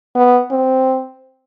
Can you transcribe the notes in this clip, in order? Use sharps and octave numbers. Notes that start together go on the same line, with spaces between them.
B3
C4